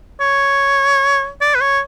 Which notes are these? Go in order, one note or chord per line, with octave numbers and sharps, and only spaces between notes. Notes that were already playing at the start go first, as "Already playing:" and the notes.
C#5
D5
B4
C#5